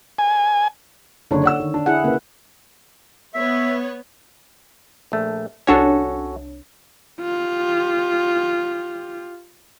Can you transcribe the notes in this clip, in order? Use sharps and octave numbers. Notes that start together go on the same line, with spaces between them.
G#5
F#1 D3 D4 C#5
D5 F#5 E6
D#3
D4
E4 G#4 F#5
C#3 A#3 B4
B3 C#5 E5
A#1 A3
C2 C#4 D4 F#4 A4 C#5
F4 G4